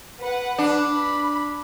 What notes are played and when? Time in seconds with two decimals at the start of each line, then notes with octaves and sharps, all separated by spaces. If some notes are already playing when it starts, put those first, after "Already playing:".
0.20 B4 F#5
0.58 D4
0.93 B5